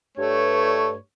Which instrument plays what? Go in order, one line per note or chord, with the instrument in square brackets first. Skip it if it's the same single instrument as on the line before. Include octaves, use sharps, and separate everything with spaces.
[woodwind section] G2 C#5 [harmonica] A3